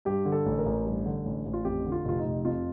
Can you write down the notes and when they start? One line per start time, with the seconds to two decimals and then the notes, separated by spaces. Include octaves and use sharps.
0.05 G2 G4
0.25 D3
0.32 A4
0.46 A1
0.59 A#4
0.66 A1
0.85 G2
1.06 D3
1.25 A1
1.46 A1
1.53 F4
1.65 F2 G4
1.85 D3
1.92 F4
2.05 F1 F4
2.19 D#4
2.25 F1
2.45 F2 F4